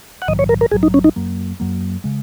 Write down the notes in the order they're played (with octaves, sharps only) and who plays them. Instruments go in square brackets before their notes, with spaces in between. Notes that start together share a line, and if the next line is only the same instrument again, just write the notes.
[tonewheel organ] F#5
[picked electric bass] A#1 G#2 D#3 F#3 [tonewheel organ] D#5
[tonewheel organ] C#5
A#4
A#4
[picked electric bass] A#1 G#2 D#3 F#3 [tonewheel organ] G#4
[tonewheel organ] D#4
C#4
D#4
[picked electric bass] F#2 F#3 A#3
F#2 F#3 A#3
C#3 G#3